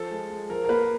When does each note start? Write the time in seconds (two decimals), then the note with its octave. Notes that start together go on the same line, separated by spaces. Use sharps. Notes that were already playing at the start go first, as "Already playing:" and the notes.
Already playing: F3 A4
0.11 G#3
0.30 G#3
0.50 F3 A#4
0.64 A#4
0.69 A#3 B4